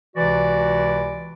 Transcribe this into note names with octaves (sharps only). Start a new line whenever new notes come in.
C#2 C3 E3 F#4 D5